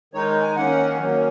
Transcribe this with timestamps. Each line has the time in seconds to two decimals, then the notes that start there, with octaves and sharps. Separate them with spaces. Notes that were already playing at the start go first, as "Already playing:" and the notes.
0.14 D#3 G#3 D#4 C#5
0.42 G#5
0.56 D#3 A#3 C#4 F#5
0.98 D#3 F#3 A#3 C#4